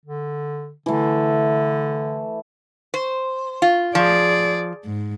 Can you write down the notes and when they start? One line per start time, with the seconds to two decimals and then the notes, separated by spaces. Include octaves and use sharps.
0.05 D3
0.86 D3 E3 A3
2.94 C5
3.62 F4
3.95 F3 G#4 D5
4.85 G#2